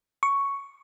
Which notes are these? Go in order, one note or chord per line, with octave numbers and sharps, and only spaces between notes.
C#6